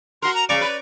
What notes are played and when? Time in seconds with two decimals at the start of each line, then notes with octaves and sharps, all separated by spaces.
0.22 F#4 A#4 C6
0.35 A#5
0.49 C#3 D5 A#5 C#6 D6
0.61 B4